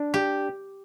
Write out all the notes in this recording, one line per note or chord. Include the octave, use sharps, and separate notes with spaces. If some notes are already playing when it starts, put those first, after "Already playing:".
Already playing: D4
G4